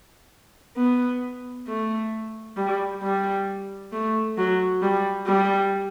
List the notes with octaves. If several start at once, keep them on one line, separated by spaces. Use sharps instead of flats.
B3
A3
G3
G3
A3
F#3
G3
G3